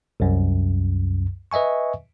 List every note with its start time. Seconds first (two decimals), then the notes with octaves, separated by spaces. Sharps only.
0.20 C2 F#2
1.51 B4 D#5 E5 G#5 C#6